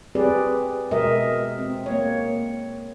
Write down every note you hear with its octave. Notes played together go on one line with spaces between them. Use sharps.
C4 G4 G#4 B4 D5
B2 G#3 A#4 D#5 E5
C4
A#3 C#5